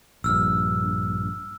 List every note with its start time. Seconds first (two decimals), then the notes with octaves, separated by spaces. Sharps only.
0.24 A#1 G2 E6 F6